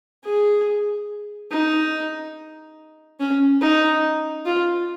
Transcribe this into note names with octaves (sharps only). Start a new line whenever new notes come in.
G#4
D#4
C#4
D#4
F4